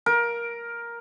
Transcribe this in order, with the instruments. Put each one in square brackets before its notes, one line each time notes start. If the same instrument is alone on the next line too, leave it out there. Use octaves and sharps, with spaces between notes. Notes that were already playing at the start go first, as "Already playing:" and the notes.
[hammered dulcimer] A#4